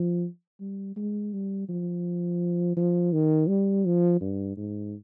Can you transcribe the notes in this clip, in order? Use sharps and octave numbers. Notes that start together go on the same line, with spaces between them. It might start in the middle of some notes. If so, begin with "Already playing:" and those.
Already playing: F3
G3
G#3
G3
F3
F3
D#3
G3
F3
G2
G#2